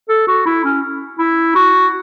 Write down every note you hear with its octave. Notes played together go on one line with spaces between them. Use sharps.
A4
F#4
E4
C#4
E4
F#4